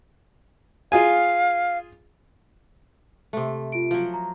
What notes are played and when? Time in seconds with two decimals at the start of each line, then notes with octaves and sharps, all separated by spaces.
0.92 F4 G#4 F5 G#5
3.33 C3 A3
3.72 F4 D7
3.91 F3 F#3
4.14 A#5